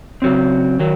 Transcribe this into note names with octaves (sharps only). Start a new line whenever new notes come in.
C#3 F#3 C4
D#3 F#3